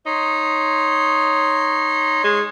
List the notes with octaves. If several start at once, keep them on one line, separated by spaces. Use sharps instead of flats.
D#4 C#5 C6
G#3